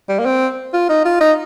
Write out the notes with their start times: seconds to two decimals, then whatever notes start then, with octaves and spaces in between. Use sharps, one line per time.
0.09 G3
0.19 A#3
0.26 C4
0.74 F4
0.89 D#4
1.05 F4
1.21 D#4